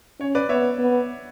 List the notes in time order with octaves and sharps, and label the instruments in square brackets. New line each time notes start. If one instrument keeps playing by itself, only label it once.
[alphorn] C#4 [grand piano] C#5
[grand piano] B4 D5
[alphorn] B3 [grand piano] C#5 E5
[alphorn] B3